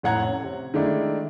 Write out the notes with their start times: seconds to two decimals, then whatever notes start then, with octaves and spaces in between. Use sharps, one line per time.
0.03 F1 A2 C#5 F#5 A#5 G#6
0.26 C#4
0.44 C3
0.74 D#3 G#3 A3 D4 E4